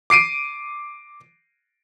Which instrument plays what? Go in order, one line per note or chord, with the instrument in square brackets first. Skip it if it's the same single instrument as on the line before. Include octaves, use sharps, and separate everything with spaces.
[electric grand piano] D6 C7 D7 D#7